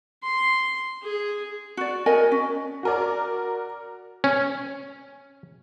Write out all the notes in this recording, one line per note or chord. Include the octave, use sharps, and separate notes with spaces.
C6
G#4
F#4 D5
A#4 C#5 D#5 G#5
C#4
F#4 A#4 D5
C#4